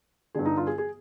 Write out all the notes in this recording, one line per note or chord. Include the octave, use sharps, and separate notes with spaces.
G2 D3 G#4
D#4
F4
G#4
G#4